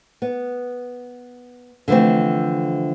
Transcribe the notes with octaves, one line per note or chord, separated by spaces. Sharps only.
B3
D3 E3 F3 A3 C4